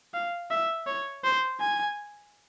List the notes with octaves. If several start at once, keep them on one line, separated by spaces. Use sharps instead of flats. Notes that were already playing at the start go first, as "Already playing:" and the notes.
F5
E5
C#5
C5
G#5